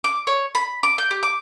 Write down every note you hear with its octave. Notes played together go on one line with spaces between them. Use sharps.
D6
C#5
B5
D6
G6
G4
D6